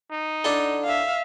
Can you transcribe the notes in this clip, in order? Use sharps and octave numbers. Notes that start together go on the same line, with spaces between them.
D#4
D3 D4 E4 A4
E5 F5